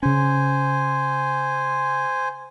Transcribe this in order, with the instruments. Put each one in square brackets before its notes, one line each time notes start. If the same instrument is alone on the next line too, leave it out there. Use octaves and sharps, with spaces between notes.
[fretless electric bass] C#3 C#4 [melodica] C5 G#5